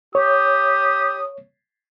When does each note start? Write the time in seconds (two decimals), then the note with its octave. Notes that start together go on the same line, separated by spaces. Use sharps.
0.15 G4 C#5 D#6